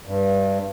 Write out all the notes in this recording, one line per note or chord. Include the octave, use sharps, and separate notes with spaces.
G2